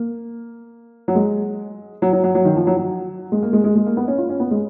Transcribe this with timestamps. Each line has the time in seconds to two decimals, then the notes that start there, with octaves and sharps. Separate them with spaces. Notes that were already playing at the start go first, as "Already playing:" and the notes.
Already playing: A#3
1.08 F#3
1.15 G#3
2.02 F#3
2.13 F#3
2.24 F#3
2.35 F#3
2.45 D#3
2.56 F3
2.67 F#3
2.77 F#3
3.32 G#3
3.42 A#3
3.53 G#3
3.64 G#3
3.75 G#3
3.86 A#3
3.97 B3
4.08 C#4
4.18 F4
4.29 C#4
4.40 B3
4.51 G#3